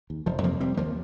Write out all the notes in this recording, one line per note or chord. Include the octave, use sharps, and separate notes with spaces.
D#2
F1 F3
F2 C3 F3 A#3
F1 G3 C4
D#2 F3 A#3